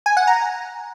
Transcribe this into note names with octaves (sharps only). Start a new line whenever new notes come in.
G#5
F#5
A#5